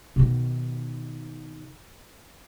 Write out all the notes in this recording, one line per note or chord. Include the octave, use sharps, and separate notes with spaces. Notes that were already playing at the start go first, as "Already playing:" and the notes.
B2 D#3